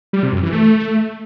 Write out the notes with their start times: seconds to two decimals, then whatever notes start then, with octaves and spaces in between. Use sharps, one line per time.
0.13 G3
0.23 C3
0.33 F#2
0.43 E3
0.52 A3